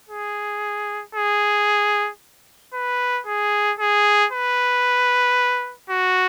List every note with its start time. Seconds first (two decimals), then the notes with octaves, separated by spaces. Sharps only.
0.09 G#4
1.15 G#4
2.74 B4
3.27 G#4
3.79 G#4
4.32 B4
5.90 F#4